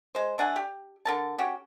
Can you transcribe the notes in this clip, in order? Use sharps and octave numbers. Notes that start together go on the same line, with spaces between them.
G#3 C5
A3 D4 F#5 G#5
G4
D3 A#4 A5
C#4 F#4 G4